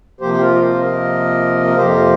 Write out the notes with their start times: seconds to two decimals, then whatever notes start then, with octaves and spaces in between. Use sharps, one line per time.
0.21 C3 F3 A#3 G4 C5
0.34 G4
0.40 F4 A#4
0.55 D#5
0.60 C5 F5
0.79 A#4 D#5
1.67 A#4
1.77 F2 C3 F3 A#3 G4 C5